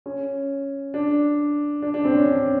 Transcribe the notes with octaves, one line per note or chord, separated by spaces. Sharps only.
C#4
D4
D4
D4
C4
C#4
D4